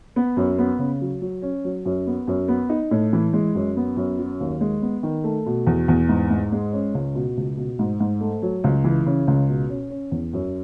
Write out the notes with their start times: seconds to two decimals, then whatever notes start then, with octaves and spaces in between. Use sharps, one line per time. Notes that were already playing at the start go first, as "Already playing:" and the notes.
0.16 B3
0.37 F#2
0.58 B3
0.79 C#3
1.01 F#3
1.22 F#3
1.42 C#4
1.64 F#3
1.85 F#2
2.07 B3
2.27 F#2
2.48 B3
2.70 D#4
2.91 A2
3.13 E3
3.33 G#3
3.55 F#2
3.77 B3
3.97 F#2
4.18 F#3
4.40 D#2
4.61 G#3
4.82 B3
5.03 D#3
5.24 A3
5.46 B2
5.67 E2
5.88 E2
6.09 G#2
6.30 G#2
6.52 G#3
6.73 C#4
6.94 C#2
7.15 B2
7.37 C#2
7.57 B2
7.79 G#2
8.00 G#2
8.21 A3
8.42 F#3
8.64 C#2
8.84 E3
9.06 C#3
9.27 C#2
9.49 B2
9.69 C#4
9.90 C#4
10.12 E2
10.33 F#2